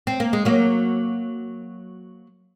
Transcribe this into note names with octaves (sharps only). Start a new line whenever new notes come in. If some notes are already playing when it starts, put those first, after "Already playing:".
C4
A#3
G#3
F#3 A#3